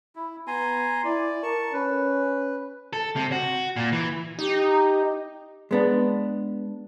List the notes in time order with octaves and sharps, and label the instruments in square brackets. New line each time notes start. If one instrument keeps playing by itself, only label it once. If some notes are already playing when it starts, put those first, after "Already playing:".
[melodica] E4
[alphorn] B3 [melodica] G#5 A#5 C6
[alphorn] E4 [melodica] D5
[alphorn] A#4 [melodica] A5 C#6
[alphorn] C#4 [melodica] B4
[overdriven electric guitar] A4
C3
F#4
A#2
E3
[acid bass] D#4 [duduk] G4
[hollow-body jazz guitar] G#3 B3 D4